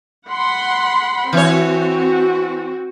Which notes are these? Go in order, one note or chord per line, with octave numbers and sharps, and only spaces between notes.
F#5 B5 C6
E3 C4 F#4 C#5